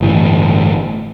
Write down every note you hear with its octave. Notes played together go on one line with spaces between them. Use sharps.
G1 A2 E3